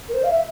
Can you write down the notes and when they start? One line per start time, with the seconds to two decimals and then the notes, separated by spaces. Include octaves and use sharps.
0.09 A#4
0.14 C5
0.23 F5
0.30 E5